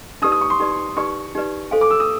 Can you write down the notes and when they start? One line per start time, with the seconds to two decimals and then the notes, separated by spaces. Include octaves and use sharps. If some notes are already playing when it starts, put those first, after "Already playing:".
0.22 D#4 G4 B4 D5 D#6
0.32 D#6
0.41 C#6
0.50 C6
0.60 D#4 G4 B4 D5
0.97 D#4 G4 B4 D5 C#6
1.35 D#4 G4 B4 D5
1.71 A4 C5 F5 G#5
1.81 D6
1.91 E6
2.00 D#6